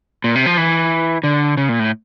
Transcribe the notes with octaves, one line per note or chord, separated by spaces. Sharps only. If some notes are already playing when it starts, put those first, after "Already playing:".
A#2
C3
F3
E3
D3
C#3
A#2
A2